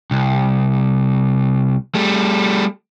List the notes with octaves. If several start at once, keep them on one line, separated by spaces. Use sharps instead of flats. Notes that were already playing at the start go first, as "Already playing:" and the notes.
C2
G3 A3